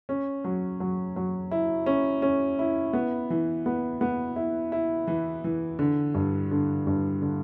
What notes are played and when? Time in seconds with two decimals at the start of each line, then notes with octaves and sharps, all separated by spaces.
0.09 C#4
0.44 F#3
0.80 F#3
1.16 F#3
1.51 E4
1.86 C#4
2.22 C#4
2.59 E4
2.93 B3
3.30 E3
3.66 B3
4.01 B3
4.36 E4
4.72 E4
5.07 E3
5.44 E3
5.79 D3
6.14 G2
6.51 D3
6.87 G2
7.22 D3